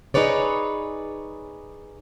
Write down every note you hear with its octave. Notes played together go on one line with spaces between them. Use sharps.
D#4 G#4 B4 C#5 D5